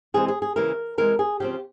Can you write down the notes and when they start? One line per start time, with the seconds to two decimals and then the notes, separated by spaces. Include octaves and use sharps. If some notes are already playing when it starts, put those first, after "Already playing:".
0.14 C3 E3 G#3 C4 G#4
0.28 G#4
0.42 G#4
0.56 C#3 E3 A#3 A#4
0.98 C3 E3 G#3 A#4
1.19 G#4
1.40 C#3 F3 C4 G4